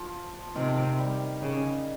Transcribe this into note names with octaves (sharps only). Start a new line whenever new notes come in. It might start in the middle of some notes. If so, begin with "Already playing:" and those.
Already playing: F3
C3 D#3
G3
C#3